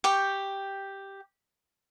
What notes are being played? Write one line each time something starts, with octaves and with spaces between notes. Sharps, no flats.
G4 G5 C#6